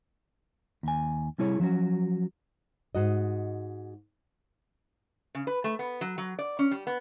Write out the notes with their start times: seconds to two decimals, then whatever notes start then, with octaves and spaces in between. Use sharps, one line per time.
0.83 D#2 G#5
1.38 C3 G3 E4 G#4 C#5
1.60 F3 F#3 C#4 F#4
2.95 G#2 F#4 D#5
5.35 C#3
5.47 B4
5.64 A3
5.79 B3
6.01 F#3
6.18 F#3
6.39 D5
6.59 C#4
6.71 G3
6.87 B3